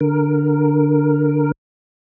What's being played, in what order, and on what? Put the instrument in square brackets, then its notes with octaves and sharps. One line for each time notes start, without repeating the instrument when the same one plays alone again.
[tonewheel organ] D3 A#4